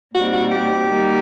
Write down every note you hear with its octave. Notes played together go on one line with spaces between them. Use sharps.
A#2 G3 C4 D#4 F#4
F#4
G4
D#3 G3 A#3 D#4 F#4